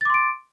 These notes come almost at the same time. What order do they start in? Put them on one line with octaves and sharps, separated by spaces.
A6 D6 C6 D7